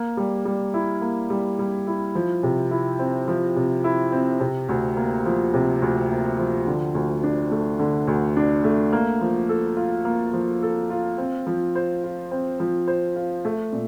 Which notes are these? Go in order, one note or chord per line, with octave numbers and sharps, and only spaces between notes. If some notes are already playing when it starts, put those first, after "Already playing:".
Already playing: A#3
G3
G3
E4
A#3
G3
G3
E4
F3
C3
E4
C4
F3
C3
E4
C4
C3
D2
A#3
F3
C3
D2
A#3
F3
D3
D2
D4
A3
D3
D2
D4
A3
A#3
F3
A4
F4
A#3
F3
A4
F4
C4
F3
C5
F4
C4
F3
C5
F4
A3
A#2